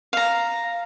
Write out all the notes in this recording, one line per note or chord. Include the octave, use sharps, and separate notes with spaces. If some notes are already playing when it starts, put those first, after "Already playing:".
F5 A#5